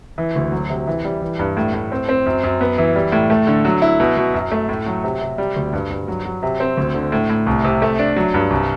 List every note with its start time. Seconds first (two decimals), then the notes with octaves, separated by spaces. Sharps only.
0.18 E3
0.35 D2
0.52 F#3
0.70 C3
0.87 E3
1.05 G3
1.22 E3
1.39 G2
1.57 A2
1.74 A2
1.92 C4
2.09 C4
2.26 F#2
2.43 F#2
2.61 B3
2.78 E3
2.96 G3
3.12 A2
3.30 A3
3.47 D3
3.65 F#3
3.82 E4
4.00 B2
4.17 B2
4.34 F#2
4.51 A3
4.69 A2
4.86 F#3
5.04 C3
5.21 C3
5.38 G3
5.56 D2
5.73 G2
5.91 G2
6.08 F#3
6.25 F#3
6.43 C3
6.60 C4
6.77 D2
6.94 D3
7.12 A2
7.30 A2
7.47 C2
7.64 C3
7.82 A3
7.99 D4
8.16 F#3
8.34 G2
8.51 C2